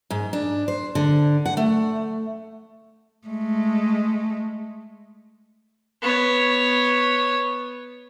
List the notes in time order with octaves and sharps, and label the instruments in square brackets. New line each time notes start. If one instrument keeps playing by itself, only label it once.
[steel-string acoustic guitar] G#2
D4
C5
D3
F#5
A3
[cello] G#3 A3
[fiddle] B3 C#5